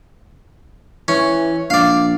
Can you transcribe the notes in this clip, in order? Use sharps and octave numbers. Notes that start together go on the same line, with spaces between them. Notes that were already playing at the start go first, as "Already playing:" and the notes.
E3 C#4
A#1 D5 F5